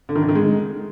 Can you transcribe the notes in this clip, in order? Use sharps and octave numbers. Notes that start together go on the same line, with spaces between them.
D3
D#3
D3
D#3
G#3